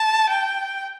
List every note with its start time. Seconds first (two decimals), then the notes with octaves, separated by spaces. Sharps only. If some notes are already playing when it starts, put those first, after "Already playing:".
Already playing: A5
0.30 G5